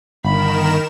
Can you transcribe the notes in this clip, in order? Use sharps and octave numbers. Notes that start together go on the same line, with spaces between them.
G1 D#3 A#4 B5 E7